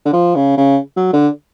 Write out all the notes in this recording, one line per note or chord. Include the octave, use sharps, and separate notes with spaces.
D3
F3
C#3
C#3
F#3
D3